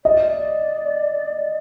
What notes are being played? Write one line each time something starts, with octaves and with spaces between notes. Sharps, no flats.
D5 D#5